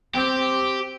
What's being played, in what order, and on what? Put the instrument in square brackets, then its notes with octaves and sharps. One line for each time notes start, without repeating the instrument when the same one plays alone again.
[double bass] C4 [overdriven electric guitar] G4